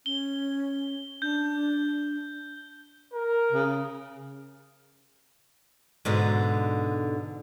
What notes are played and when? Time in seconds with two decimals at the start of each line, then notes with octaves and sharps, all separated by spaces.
0.06 C#4 G7
1.22 D4 G6
3.14 A#4
3.52 C#3
6.05 G#2 B2 D3